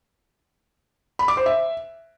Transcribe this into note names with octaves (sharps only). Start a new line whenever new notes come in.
B5
D6
C5
E5